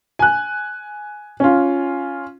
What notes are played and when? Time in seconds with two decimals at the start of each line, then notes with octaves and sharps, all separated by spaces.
0.19 G#5 F#6
1.40 C#4 F4